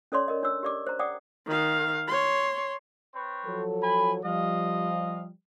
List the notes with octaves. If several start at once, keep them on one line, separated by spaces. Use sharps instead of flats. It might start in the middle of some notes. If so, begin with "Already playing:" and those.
C#4 A4 C#5 D5 C6
A#4 D#5
D4 C#5 E6
G4 D5 D6
C5 A#5
D5 F#5 G5 D6 D#6
D#3 F5
C#5 C6
C4 B4 C#5
F3 F#3 A4
G#5 B5
F3 G3 D#5 F5